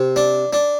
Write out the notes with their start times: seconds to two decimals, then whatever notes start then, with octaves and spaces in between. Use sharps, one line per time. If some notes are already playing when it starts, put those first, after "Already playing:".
Already playing: C3
0.16 D4
0.53 D4